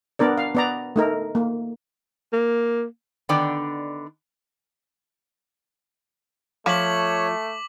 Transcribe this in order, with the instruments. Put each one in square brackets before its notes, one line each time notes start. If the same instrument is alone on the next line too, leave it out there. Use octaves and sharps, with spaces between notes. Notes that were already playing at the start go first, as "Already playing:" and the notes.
[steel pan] B3 D4 A#4 D5
F5
B3 D5 A#5
A3 D#4 A#4
A#3
[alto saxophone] A#3
[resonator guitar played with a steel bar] D3 D#3 B3 D4 D5 G5
[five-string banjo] F3 [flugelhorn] A3 [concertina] C#5 [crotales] D6 B6 F#7